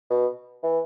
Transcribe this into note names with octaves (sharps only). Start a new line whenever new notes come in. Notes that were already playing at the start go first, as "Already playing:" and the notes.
B2
E3